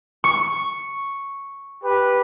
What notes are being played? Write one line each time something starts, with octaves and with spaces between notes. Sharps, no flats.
C#6
G4 B4